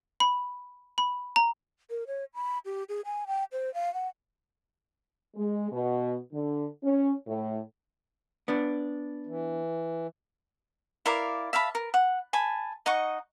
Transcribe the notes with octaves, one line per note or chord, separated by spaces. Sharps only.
B5
B5
A#5
A#4
C#5
B5
G4
G#4
G#5
G5
C5
F5
F#5
G#3
B2
D3
C#4
A2
B3 D4
E3
E4 A#4 D5 F5
E5 F5 A5 B5
A#4
F#5
G#5 A5 B5
D#4 D#5 F#5 C#6